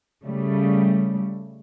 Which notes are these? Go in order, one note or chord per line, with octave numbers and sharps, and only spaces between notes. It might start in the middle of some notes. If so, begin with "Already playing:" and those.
C#3 G3 A3